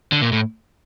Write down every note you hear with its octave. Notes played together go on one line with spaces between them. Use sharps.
D3
A#2
A2